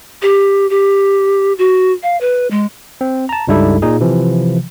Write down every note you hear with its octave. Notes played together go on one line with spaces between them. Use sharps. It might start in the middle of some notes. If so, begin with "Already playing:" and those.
G4
G4
F#4
F5
B4
G#3
C4
A5 A#5
C#2 G2 G3 D#4 E4 A4
A#2 D#4 G#4
C3 E3 F3